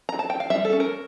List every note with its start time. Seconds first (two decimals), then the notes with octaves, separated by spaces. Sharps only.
0.09 A#5
0.19 A5
0.30 G5
0.40 F5
0.50 G3 E5
0.65 A4
0.73 C#4
0.80 A#4